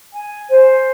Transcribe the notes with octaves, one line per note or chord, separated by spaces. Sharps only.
G#5
C5